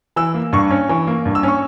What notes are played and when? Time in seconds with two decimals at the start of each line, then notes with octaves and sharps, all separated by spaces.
0.16 E3 E6
0.34 A#3
0.53 G2 C#6
0.71 C#4
0.89 E3
1.07 A#3
1.25 G2
1.35 E6
1.43 C#4 C#6